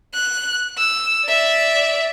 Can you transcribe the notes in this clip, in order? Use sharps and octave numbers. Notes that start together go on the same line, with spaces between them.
F#6
E6
D5 E5